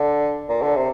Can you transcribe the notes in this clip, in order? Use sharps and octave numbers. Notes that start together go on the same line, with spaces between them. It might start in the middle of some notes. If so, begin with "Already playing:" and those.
Already playing: D3
A#2
D3
C3